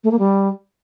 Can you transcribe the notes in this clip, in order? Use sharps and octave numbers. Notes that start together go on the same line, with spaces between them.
A3
A#3
G3